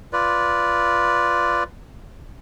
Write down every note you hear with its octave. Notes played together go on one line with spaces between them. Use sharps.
F4 B4 D5